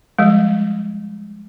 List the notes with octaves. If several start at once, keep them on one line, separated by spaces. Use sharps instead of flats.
F3 G3 G#3